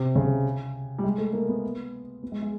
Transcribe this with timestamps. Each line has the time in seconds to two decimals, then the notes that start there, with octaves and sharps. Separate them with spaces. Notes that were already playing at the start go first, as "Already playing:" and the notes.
Already playing: C3
0.16 C#3
0.99 G3
1.04 G#3
1.18 A3
1.33 A#3
1.49 B3
2.23 B3
2.32 G#3
2.42 G#3